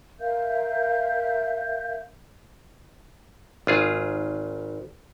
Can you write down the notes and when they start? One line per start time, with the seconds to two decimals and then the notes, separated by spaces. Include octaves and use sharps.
0.20 A#4 E5 F5 G6
3.67 G#1 F4 G#4